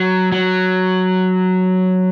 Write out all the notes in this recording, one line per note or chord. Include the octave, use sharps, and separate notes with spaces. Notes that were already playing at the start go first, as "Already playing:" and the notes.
Already playing: F#3
F#3